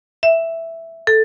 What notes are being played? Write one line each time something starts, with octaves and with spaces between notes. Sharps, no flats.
E5
A4